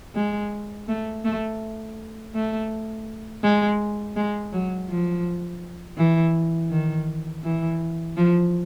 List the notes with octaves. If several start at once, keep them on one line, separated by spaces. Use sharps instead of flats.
G#3
A3
A3
A3
G#3
G#3
F#3
F3
E3
D#3
E3
F3